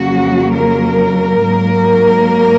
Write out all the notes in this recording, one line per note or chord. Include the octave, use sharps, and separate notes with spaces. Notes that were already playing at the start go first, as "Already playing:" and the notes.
Already playing: F2 C#3 F#3 A#3 F#4
A#4
G#2 F#3 A#3